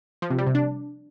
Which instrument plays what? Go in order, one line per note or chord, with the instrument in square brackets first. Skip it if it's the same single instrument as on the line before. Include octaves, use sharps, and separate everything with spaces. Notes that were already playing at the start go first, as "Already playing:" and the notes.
[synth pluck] F3
C3
G3
C3
D4